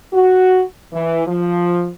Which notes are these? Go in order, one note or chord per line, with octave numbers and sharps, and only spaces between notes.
F#4
E3
F3